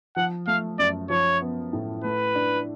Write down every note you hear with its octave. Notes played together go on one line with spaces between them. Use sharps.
F3 F#5
A3 F5
F#2 D5
F3 C#5
B3
A2
A3 B4
D4